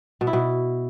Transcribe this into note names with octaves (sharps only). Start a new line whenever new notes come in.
B2
E4
B2